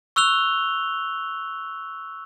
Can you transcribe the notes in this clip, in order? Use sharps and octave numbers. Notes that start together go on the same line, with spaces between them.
C#6 E6 F#6 F7 G7